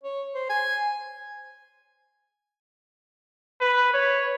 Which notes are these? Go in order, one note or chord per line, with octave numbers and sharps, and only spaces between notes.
C#5
C5
G#5
B4
C#5